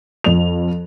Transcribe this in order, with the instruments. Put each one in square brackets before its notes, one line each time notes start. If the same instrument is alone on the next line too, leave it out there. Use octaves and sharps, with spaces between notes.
[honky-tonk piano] F2 F7